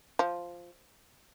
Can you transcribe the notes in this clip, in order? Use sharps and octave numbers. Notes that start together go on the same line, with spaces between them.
F3